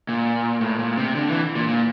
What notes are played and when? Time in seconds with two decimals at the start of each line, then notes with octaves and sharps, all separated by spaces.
0.09 A#2
0.61 A2
0.79 A#2
0.97 C3
1.15 D3
1.29 E3
1.55 A#2
1.68 A#2